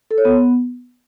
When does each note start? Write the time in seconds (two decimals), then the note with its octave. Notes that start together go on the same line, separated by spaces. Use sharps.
0.11 A4
0.18 C#5
0.25 B3